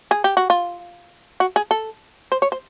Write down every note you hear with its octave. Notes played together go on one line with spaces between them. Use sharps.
G#4
G4
F#4
F4
F#4
G#4
A4
C5
C#5
C5